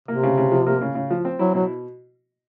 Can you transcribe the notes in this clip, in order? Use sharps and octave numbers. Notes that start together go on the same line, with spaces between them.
C3 A#3
C#3
C#3
F3
A#3
C#3
C#3
F3
C4
F#3 E4
B2 F#3